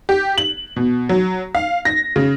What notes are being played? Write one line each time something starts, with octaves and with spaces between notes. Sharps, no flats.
G4
F#7
B2
F#3
F5
A#6
C#3